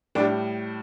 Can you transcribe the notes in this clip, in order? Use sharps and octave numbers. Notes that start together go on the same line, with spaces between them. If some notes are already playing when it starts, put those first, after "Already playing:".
A2 G3 D4